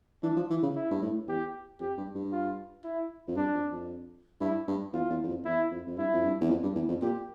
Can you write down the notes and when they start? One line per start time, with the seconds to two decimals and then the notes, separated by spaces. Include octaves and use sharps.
0.23 E3 D4
0.37 F3
0.50 E3
0.63 C#3
0.75 E4
0.91 G2
1.02 A2
1.27 E2 G4
1.80 F2 G4
1.98 G2
2.15 G2
2.32 F4
2.84 E4
3.28 F2
3.37 G2 D4
3.54 F2
3.72 F2
4.41 G2 E4
4.68 G2
4.93 E2 F4
5.10 E2
5.24 E2
5.28 F2
5.45 E2 E4
5.71 F2
5.87 F2
5.98 G2 E4
6.14 F2
6.24 G2
6.41 E2
6.50 F2
6.63 G2
6.75 E2
6.89 F2
7.02 A#2 G4